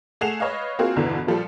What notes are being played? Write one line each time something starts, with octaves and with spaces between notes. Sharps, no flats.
A3 G#4 F#5 C7 E7 F7
B4 C#5 D#5 F5
A#3 C4 F4 F#4 G#4
G1 E2 B2 D3 E3
A#2 F3 G3 A4